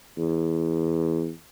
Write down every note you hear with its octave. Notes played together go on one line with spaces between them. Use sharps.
E2